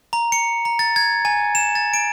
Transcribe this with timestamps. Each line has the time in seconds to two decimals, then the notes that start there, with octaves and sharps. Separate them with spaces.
0.13 A#5
0.32 C#7
0.65 A#5
0.79 A6
0.96 G#6
1.25 G#5
1.55 E7
1.75 A6
1.93 D7